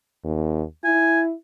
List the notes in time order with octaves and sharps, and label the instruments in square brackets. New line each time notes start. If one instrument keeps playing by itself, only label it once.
[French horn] D#2
[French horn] E4 [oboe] G#5